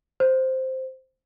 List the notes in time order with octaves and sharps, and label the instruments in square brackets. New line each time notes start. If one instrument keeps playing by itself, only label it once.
[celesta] C5